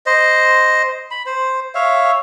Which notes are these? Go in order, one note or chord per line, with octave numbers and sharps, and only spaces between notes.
C5 D#5
B5
C5
C#5 E5 F5